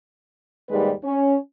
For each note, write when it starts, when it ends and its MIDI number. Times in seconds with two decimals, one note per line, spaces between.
0.70 0.91 39
0.70 0.91 44
0.70 0.91 55
0.70 0.91 56
0.70 0.91 71
1.03 1.34 61